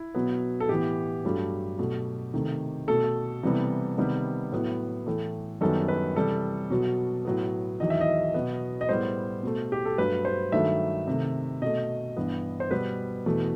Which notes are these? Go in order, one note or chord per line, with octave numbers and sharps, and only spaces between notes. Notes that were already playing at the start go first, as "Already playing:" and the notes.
Already playing: E4
B2 F#3 B3
A4
A2 E3 B3 G4
G2 F#3 A3
B2 F#3 A3
C3 D#3 A3
B2 A3 A4
C3 E3 G3 B3
C3 D#3 G3 B3
A2 F#3 B3
A2 E3 A3
F#2 D#3 G3 B3 A4
B4
C3 E3 G3 A4
B2 F#3 B3
A2 F#3 B3
E2 D#3 F#3 D#5
E5
D#5
B2 F#3 B3
D#5
A2 G3 B3 C5
B2 A3
G4
A4
G2 F#3 A3 B4
C5
G2 D#3 F#3 A3 E5
C3 D#3 A3
B2 A3 D#5
G2 E3 B3
C5
B2 G3 B3 B4
E2 B2 A3